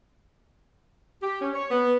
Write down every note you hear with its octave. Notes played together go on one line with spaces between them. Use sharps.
G4
C#4
C#5
B3